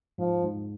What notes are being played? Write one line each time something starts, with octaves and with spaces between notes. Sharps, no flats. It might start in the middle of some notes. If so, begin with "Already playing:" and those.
G#2 F3
G#2